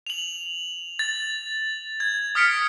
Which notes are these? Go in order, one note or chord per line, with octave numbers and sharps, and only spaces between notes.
F7 F#7
A6
G#6
D#6 F6 B6 C#7 D7